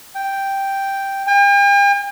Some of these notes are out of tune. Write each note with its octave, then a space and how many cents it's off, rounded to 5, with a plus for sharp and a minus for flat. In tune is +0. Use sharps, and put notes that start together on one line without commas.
G5 +0
G5 +45